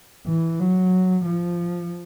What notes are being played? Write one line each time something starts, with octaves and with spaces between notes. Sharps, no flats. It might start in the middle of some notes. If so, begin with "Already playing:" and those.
E3
F#3
F3